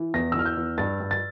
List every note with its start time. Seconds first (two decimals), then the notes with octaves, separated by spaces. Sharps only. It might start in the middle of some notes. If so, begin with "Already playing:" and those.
Already playing: E3
0.14 E2 A#6
0.32 E6
0.35 E2 F6
0.46 G6
0.57 E2
0.78 G2 A6
1.00 G2
1.11 A6